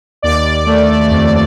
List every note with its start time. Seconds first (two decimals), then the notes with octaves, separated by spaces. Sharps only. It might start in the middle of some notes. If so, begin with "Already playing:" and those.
0.22 D#2 D5
0.66 A3
1.10 F2